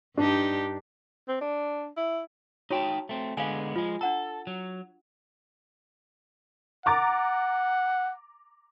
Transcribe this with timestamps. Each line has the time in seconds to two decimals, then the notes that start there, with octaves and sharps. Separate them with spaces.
0.17 G2 D4 D#4 G4
1.28 C4
1.41 D4
1.97 E4
2.70 D#4 F#4 C#5 G5 A5 C#6
3.09 A3 C4
3.37 D3 G#3 B3 F5 G#5
3.76 F3 G#3 F4
4.01 D4 A4 F#5 A#5
4.47 F#3
6.86 F#5 A#5 D6 A6